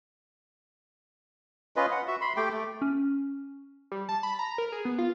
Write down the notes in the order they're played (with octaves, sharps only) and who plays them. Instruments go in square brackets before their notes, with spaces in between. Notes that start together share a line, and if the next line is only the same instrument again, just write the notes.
[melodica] C#4 F4 B4 D#5
F#5
F#4 E5
B5 C6
A3 G4 G5
A3
[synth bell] C#4
[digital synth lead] G3
A5
B5
A#5
A#4
G#4
B3
F4